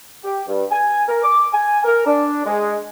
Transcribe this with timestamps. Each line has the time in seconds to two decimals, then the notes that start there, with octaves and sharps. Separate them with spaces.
0.24 G4
0.47 G2
0.71 G#5
1.08 A#4
1.23 D6
1.53 G#5
1.84 A#4
2.06 D4
2.46 G#3